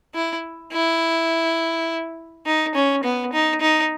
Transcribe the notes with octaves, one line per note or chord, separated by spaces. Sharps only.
E4
E4
D#4
C#4
B3
D#4
D#4